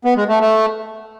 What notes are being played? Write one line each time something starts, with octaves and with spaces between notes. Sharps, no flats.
B3
G#3
A3
A3